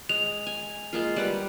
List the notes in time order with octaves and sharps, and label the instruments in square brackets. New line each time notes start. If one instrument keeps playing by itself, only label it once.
[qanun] G#3 [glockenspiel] F7
[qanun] G#5
G#3 A#3 F4
G3 B4 F#5